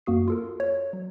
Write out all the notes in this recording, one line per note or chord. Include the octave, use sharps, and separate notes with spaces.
F#2 A#3 F#4 D#6 C7
F4 A4 A#4
C#5
F#3